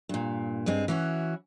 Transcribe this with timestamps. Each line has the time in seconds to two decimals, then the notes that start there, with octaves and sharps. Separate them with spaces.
0.09 G2 A#2
0.66 G2 G#3 C4
0.88 E3 C#4 F#4